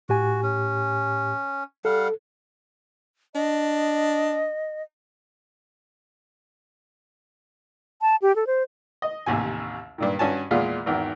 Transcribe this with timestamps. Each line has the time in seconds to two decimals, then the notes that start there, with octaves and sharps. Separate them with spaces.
0.09 A2 F#4 G4 G#5
0.43 C#4
1.85 G3 A4 F5 F#5
3.35 D4 D#5
8.02 A5
8.22 G4
8.36 A4
8.47 C5
9.02 D#5
9.26 A1 D#2 C3 G#5
9.98 G2 A#2 D#3
10.19 G2 C#4 F#4 G#5 A5
10.51 E2 A#2 G#3 F4 F5
10.86 G#1 E2 D#3